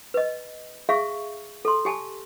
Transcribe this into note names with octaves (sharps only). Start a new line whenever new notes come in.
B4 D#5
G#4 E5 F5 C#6
A4 C6
G4 G#5 A5